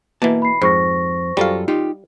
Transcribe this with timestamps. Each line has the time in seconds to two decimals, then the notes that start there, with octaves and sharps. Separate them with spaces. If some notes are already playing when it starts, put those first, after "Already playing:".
0.22 B2 E3 A#3 A5
0.42 B5 C7
0.62 F2 G#2 C5 C#6 A#6
1.37 F#2 G3 F4 A4 F5
1.68 D#4 F4 G4